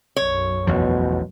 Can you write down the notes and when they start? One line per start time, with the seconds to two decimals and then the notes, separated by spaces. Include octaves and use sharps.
0.16 B1 F#2 C#5
0.67 A1 E2 B2 F3